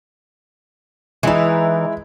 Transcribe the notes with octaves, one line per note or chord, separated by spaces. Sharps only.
E3 G#3 D#4 E4